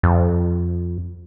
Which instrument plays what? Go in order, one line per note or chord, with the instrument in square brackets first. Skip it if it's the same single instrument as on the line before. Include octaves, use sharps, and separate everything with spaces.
[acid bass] F2